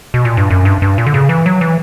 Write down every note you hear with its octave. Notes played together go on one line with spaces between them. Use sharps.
B2
A#2
G2
F#2
G2
G2
A#2
D3
C#3
E3
F#3
E3